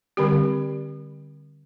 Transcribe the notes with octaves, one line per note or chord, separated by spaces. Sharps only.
D3 G3 C4 G4